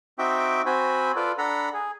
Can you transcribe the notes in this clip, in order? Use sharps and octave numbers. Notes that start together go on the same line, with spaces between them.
C4 D#4 F#4 E5 G5 D6
C4 F#4 C5 G#5 B5
F4 A4 B4 D5
D4 A4 F#5 A#5 B5
G#4